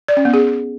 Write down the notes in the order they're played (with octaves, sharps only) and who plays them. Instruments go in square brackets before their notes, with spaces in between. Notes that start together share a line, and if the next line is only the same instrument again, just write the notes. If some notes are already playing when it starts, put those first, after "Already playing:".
[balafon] D5
C#4
B3
G#4